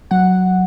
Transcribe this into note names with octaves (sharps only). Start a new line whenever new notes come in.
F#3 F#5